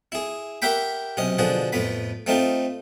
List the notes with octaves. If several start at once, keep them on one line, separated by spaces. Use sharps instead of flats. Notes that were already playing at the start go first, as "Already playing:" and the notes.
E4 G#4
G4 A#4 E5 F#5 G5 B5
B1 C3 C#4 D#5
B2 D3 F3 F#4 G#4
F2 A2 B3 B5
A3 C4 D#4 F4